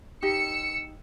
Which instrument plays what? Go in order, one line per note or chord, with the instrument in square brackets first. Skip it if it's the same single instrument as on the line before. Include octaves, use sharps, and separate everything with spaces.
[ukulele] D#4 G4 [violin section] E6 C#7